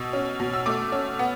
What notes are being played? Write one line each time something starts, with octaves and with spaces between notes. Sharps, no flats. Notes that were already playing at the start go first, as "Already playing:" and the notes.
Already playing: B2 E6
C#4
B2
E6
A3 D6
C#4
B3